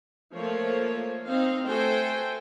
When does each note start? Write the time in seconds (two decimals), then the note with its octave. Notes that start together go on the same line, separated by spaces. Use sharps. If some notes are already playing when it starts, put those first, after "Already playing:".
0.34 F3 A3 A#3 C#5
1.26 C4 D#4 F5
1.67 A3 F#4 A4 C5 G5 G#5